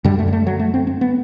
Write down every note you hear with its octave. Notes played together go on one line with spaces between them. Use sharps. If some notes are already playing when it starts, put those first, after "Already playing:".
F#2 D3 G3
A3
G3
A3
F#3
A3
C4
C4
B3